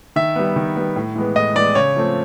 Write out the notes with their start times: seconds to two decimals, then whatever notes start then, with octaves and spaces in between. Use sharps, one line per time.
0.16 D#3 E5
0.36 G3 B3
0.56 D#3
0.76 G3 B3
0.96 A2
1.16 E3 G#3 B3
1.36 A2 D#5
1.56 E3 G#3 B3 D5
1.75 C#3 C#5
1.96 F3 A3 C4